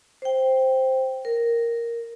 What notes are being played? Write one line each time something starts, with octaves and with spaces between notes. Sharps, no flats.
C5 G5
A#4